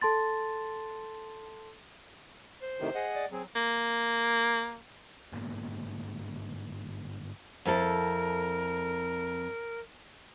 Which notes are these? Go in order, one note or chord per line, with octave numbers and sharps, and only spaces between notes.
A4 A5 C6 A6
C5
A2 C3 D#3
G#4 D#5 F#5
D5
F#3 C4 G#4
A#3
G1 G#2 A#3 B3
F2 E4 A4 A#4